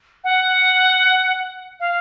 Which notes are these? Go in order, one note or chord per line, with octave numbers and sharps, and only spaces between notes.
F#5
F5